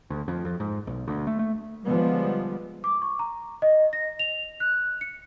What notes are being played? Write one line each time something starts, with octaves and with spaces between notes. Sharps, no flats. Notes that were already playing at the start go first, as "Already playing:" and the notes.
D2
F2
F2
G#2
B1
D2
A3
A3
D3 F3 G3 G#3 B3
D6
C#6
A#5
D#5
A#6
F7
F#6
C#7